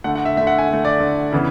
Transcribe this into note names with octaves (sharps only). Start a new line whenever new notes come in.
D3 A3 F#5
F#5
E5
D3 A3 E5
F#5
G#5
D3
A3
D5
D3 A3
C#3 E3 B3